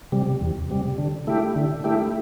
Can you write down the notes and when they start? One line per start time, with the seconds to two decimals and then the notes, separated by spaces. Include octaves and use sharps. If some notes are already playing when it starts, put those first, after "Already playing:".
0.12 C3 G3
0.41 E2
0.70 C3 G3
0.98 D3
1.27 A3 E4 G4
1.56 D3
1.84 A3 E4 G4